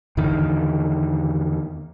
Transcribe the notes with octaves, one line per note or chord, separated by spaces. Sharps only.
E2 D3 D#3